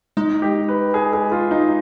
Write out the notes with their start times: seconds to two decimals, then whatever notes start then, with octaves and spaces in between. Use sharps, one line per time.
0.17 G#3 D#4
0.42 G4
0.68 B4
0.94 G#4
1.13 G#4
1.32 F4
1.51 D#4